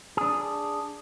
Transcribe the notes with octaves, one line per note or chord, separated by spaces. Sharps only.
D4 G#4